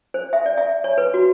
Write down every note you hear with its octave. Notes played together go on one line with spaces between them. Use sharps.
C5
E5
D5
E5
C#5
B4
F#4